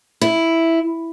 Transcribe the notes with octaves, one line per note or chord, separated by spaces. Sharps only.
E4